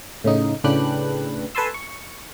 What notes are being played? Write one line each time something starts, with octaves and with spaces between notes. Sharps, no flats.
A2 C#3 D#4
A2 C#3 D4 B4 G5 F#6
A4 B4 G#5 A5 C6 E6
C#6